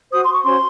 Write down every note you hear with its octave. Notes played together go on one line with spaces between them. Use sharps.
F#4 C5 D#6
C6
C#6
C#4 F#4 C5 C6